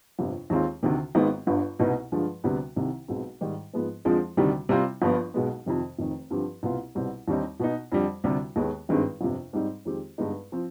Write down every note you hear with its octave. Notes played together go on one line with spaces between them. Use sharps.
G1 F2 C3
D#2 D#3 G#3 C4 F4
D2 C3 D#3
G#1 G#2 D#3 G#3 B3
G1 G2 D3
C2 B2 B3 D#4
G2 D3 F3 G#3
D2 C3 G3 B3
C2 C3 D#3
B1 B2 G#3 C4
G#2 D#3 G3
G#2 F3 G#3 B3
F2 D3 F3 G#3 C4
D2 C3 D#3 G3
C3 G3 C4 F4
G1 G2 F3 B3
B1 B2 G#3 B3
F2 C3 D#3
F1 F2 D#3
G2 D3 F3 C4 G4
C2 B2 B3 F4
C2 B2 G3 C4
D#2 D3 G3 C4 D#4
B2 B3 D#4
F2 D3 G3
D2 C3 G3
D#2 D#3 G#3 B3
G#1 G2 D#3 G#3 C4
G1 F2 C3
G#2 G3 C4 D#4
F2 D#3 G#3 C4 G4
G2 D3 G#3 B3 D#4
F3 C4